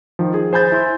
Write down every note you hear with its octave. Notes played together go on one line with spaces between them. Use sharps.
D#3 F3
G#4
C5 G#5 B5 G6 A6
E4 B5 C6